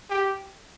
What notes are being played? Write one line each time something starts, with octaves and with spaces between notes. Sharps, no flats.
G4